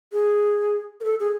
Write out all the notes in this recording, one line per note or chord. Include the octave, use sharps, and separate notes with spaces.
G#4
A#4
A4
G#4